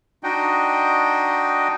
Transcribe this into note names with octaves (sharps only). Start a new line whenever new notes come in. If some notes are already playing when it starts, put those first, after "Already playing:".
D4 D#4 F#4 D#5 G5